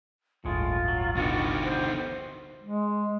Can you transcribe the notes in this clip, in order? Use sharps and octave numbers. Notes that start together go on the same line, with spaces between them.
D1 G1 A2 G#3 F4
F#3
B2 D3 G3 D#4 F#4
C5
G#3